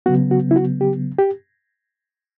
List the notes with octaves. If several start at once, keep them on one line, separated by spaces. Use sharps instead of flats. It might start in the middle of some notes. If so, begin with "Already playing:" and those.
C#3 F#3 B3 F#4
F#4
E4
F#4
G4
G4